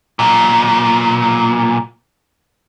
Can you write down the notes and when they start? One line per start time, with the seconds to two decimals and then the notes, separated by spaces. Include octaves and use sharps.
0.19 B1 A#2